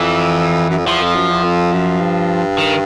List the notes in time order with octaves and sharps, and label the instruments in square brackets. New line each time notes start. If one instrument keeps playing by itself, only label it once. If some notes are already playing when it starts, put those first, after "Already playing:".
Already playing: [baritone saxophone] F2 [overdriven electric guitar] E3
[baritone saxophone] F#2
F2
[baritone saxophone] E2 [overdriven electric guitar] F3
[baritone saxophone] F2
F#2
E2
F2
F#2
G2
[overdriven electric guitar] D#3